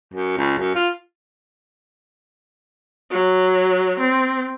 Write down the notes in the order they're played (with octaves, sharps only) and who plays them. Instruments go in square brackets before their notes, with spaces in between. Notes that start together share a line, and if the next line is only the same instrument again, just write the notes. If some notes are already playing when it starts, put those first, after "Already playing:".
[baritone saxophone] F#2
C#2
F#2
F4
[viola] F#3
C4